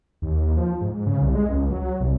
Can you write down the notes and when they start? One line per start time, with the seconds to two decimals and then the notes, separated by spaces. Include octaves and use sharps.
0.22 D#2
0.57 F3
0.81 G#2
1.06 C#3
1.21 C2
1.35 G#3
1.49 C#2
1.70 F#3
2.00 C2